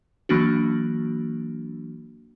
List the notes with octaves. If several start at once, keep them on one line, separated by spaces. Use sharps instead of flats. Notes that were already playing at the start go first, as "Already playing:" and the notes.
E3 F#3 A#3 D4 F#4